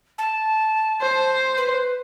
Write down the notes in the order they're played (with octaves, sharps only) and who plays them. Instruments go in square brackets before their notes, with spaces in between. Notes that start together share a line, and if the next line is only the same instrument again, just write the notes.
[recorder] A5
[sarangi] C5
[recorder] B4